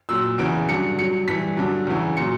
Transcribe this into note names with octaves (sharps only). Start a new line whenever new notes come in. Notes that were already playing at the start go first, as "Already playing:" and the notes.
A#2 F#3 E6
E2 C#3 E3 D7
G2 D3 F#3 C#7
G2 F#3 C#7
G2 E3 B6
G2 D3 F#3
E2 C#3 E3
A#2 F#3 C#7